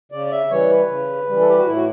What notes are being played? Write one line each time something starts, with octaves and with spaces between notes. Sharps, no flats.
C#3 D5
D5
E5
E3 G3 C#5
B4
C#3
E3 G3
A4
G4
F#4
A2 E4
F#4